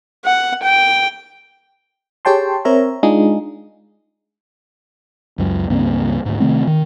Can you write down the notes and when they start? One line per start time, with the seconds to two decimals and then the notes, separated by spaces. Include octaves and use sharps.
0.25 F#5
0.63 G5
2.25 G4 G#4 C#5 G5 A5 C6
2.65 C4 A#4 C#5 E5 A#5
3.03 G#3 D4 D#4 F4 G#4
5.38 C#2 F#2
5.70 C#2 G2 A#3 C4
6.25 D2 G#2
6.40 C3 D#3 A3 C4
6.67 D#3